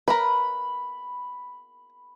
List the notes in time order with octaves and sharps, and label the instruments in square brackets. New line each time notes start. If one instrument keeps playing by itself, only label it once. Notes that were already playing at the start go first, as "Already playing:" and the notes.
[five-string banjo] A#4 B4 [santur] B5